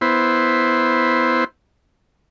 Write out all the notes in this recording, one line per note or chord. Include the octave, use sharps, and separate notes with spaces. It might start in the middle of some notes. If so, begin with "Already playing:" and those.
B3 E4 C5